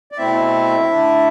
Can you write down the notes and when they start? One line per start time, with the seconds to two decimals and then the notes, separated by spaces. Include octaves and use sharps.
0.12 D5
0.18 B2 A3 C4 E4 E5
0.91 D3 A3 D4